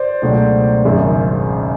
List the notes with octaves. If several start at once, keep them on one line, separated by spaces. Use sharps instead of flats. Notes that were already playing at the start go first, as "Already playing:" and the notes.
Already playing: C5 D5
C#2 B2 F#3 A3 D4
G#1 F#2 C#3